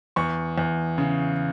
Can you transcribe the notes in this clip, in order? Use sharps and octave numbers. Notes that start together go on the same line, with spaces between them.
E2 C#6
E2
C#3